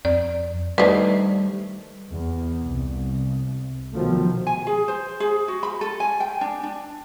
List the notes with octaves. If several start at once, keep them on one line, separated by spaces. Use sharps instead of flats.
F2 D5
D#3 G3 A3 D4 B4 C5
E2
C2
B2 D#3 F3 F#3 A3
G#5
G#4
C5
G#4
F#4
B5
A4
G#5
G5
D4
D4